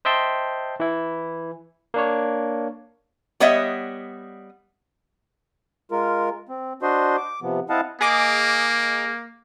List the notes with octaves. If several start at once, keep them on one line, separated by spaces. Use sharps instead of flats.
C5 D#5 E5 G5 A5 C6
E3 E4
A#3 D4 C#5
G3 B3 C#5 D#5 E5 F#5
G#3 F4 A#4
C4
D4 F#4 C5 D#5 C6
D6
C3 F3 B3
C4 E4 D#5 F5 F#5 A5
A#3 G#4 D#5 D6